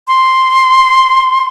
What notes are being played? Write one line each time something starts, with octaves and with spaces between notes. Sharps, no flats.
C6